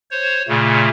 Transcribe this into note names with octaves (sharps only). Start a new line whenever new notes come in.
C5 C#5
A#2 C#3 A3